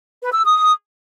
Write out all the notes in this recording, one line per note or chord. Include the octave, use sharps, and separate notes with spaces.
B4
E6
D#6